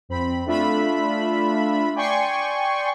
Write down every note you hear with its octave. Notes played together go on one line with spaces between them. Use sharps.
F2 C4 B5
A3 D4 F4 E5 B5
D5 G5 G#5 C6 C#6